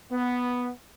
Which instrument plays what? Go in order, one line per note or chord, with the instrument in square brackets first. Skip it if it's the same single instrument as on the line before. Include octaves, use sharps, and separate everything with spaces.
[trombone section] B3